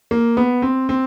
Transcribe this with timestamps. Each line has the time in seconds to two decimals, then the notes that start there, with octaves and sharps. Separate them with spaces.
0.11 A#3
0.37 B3
0.62 C4
0.89 C4